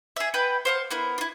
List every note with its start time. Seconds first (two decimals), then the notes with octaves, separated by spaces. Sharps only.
0.16 G#4 E5
0.34 B4 F#5 G5
0.65 C5 F5 F#5
0.91 B3 E4 A#4
1.18 E4 F4